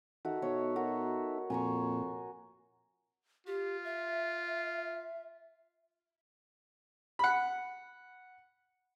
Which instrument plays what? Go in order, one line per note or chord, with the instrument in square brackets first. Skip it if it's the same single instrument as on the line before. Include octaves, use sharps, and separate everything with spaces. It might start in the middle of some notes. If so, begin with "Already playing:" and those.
[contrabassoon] D#3 [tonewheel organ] D#4 A4 E5 [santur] F#4
[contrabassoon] B2 [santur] C#5
[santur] F#4 A#4
[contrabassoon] F2 [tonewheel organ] A#2 [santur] G#5 A#5 C#6
[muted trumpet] F4 [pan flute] G4
[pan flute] E5
[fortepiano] F#5 B5